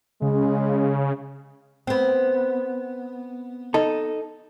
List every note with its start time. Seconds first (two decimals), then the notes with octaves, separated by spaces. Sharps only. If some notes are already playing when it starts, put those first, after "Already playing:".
0.22 C#3 G#3
1.87 B3 C4
3.74 D#4 A4